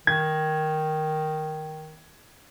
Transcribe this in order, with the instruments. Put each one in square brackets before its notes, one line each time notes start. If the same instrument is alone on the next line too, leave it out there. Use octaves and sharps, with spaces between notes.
[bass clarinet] D#3 [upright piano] G#6